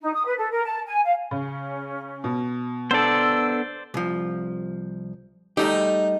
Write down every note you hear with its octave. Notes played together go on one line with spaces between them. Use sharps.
D#4
D#6
B4
A4
A#4
A5
G#5
F5
C#3 C#4
B2
B3 D4 A4 C5 D5 E6
C2 F3
G3 A3 D#4 G4